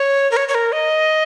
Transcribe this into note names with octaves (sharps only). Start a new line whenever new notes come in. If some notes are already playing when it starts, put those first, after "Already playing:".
Already playing: C#5
A#4
C#5
C#5
A#4
D#5